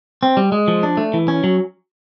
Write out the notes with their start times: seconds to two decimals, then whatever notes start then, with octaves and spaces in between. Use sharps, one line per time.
0.23 C4
0.37 G3
0.52 G#3
0.68 F3
0.83 D4
0.97 A3
1.13 E3
1.28 C#4
1.44 F#3